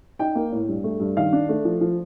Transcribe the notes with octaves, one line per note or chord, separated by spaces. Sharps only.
D#4 G5
A#3
A2
G2
A3
G2
D#3 F5
D4
A3
F3
F3